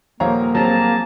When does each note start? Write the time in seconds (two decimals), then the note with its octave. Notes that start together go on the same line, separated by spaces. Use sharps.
0.20 D#1 F3 A#3 C#5 F5 A#5
0.55 F#3 C4 G#4 A5 A#5